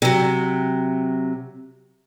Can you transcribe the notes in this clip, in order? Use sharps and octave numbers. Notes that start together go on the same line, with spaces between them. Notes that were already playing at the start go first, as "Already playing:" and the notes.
C3 F#3